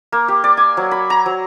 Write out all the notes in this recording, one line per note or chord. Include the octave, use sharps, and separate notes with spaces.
A#3
G4
D5
G#5
F#3
B5
A#5
F#3